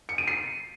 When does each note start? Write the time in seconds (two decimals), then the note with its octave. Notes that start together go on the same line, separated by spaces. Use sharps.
0.09 C#7
0.18 D#7
0.28 C7